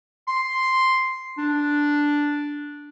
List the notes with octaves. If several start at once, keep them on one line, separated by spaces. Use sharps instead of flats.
C6
D4